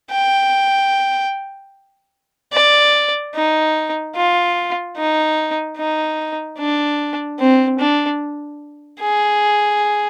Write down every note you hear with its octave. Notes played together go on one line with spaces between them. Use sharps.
G5
D5
D#4
F4
D#4
D#4
D4
C4
D4
G#4